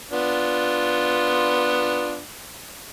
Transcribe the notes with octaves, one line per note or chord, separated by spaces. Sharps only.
B3 D4 F4